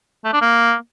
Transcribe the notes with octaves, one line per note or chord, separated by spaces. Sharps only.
A3
D4
A#3